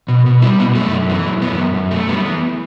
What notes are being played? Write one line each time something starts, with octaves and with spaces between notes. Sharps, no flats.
B2
B2
G3 E4
B2 B3
F#2 A3
F#2
E3
F#2
F#2 B3
F#2
F#2
A3
G3 B3
E3